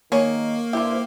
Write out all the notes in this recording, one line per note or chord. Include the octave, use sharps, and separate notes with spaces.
D#3 A#3 G#4 C#5
G2 C3 E4 G4 C5 E5